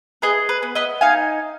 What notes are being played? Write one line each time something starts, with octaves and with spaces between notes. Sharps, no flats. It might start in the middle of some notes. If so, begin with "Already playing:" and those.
G#4 B4 D#5
B4
B3
B4 D#5
D#4 F5 G#5